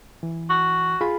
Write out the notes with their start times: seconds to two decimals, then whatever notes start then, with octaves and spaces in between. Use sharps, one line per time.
0.23 E3
0.50 F#4
1.01 F4 G#4 B5